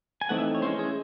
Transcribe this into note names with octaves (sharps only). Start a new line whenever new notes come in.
G#5
E3 A3 C4 D#4 F#5
E5
C#5
G#3 C#4 E4 C5
G#4